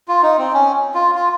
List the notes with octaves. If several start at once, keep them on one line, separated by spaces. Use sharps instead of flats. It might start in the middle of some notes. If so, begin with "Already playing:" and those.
F4
D#4
C4
C#4
F4
F4